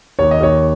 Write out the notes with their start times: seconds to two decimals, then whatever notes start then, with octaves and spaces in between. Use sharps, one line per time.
0.19 D#2 C#5
0.31 D#5
0.40 D#2 C#5